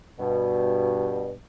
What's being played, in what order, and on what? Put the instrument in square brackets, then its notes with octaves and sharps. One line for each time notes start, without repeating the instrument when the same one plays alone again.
[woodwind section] G2 B2